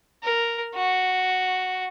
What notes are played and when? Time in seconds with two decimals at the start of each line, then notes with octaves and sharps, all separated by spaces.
0.23 A#4
0.75 F#4